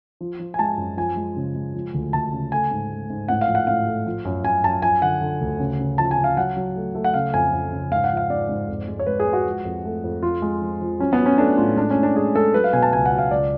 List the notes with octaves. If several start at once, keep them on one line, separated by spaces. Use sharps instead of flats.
F3
F3
G#5
G#3 A5
F#2
F3 G#5
G#3
C#3
G#3
F3
D2
D2 A5
C#3
A3 G#5
G#2
A3
G#2
A2 F#5
F5
F3
F#5
A2 F5
A3
F3
F#2
F#2 G#5
F#2 A5
F3 G#5
D3 F#5
D3
D2
C#3
C#3
F3 A5
G#5
C#3
F5
F#3 F#5
F#3
A3
A3
F#5
C#3 F5
F2 G#5
F2
C#3
G#2 F5
F#5
F3
F5
G#2 D5
G#2
F2
G#3
C#5
G#3 B4
G#4
G#3
F#4
F3
F2
A3
F2
F3 F4
G#3
F3
F3
F#3 C#4
B3
F#3
C#4
A3 D4
A2 F4
G#3 D4
C#4
A2
D4
G#3 G#4
G#3 A4
F#3 B4
F5
B2 G#5
A5
C#2 G#5
F#5
F#3
F5
C#2 D5